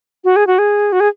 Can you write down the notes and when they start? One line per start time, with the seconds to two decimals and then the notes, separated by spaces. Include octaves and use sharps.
0.24 F#4
0.36 G#4
0.47 F#4
0.59 G#4
0.92 F#4
1.00 G#4